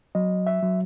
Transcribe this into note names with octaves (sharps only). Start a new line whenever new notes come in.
F#3 D#5
E5
F#3